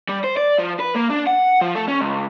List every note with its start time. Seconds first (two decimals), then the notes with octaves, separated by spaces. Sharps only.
0.09 G3
0.24 C5
0.37 D5
0.58 F3
0.80 B4
0.95 A#3
1.10 D4
1.27 F#5
1.61 F3
1.75 A3
1.88 C#4
2.01 C#2